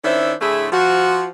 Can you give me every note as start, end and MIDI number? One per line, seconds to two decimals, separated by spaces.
0.04 0.34 51
0.04 0.34 61
0.04 0.34 62
0.04 0.34 64
0.04 0.34 72
0.04 0.34 76
0.41 0.67 45
0.41 0.67 50
0.41 0.67 57
0.41 0.67 64
0.41 0.67 68
0.72 1.30 53
0.72 1.30 66